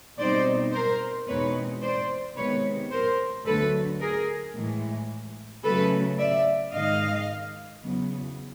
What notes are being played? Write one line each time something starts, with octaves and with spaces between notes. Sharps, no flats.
B2 G3 C4 D#4 C5 D5
A#4 C5
E2 B2 G#3 C4 D#4 B4 C#5
C5 D5
C3 D#3 G#3 B3 B4 C#5
A#4 C5
D2 D3 F#3 A3 A4 B4
G#4 A#4
A2 E3 G#3
C#3 F#3 A3 C#4 A4 B4
D5 E5
G#2 D#3 G#3 D#5 F5
E2 C#3 F#3 B3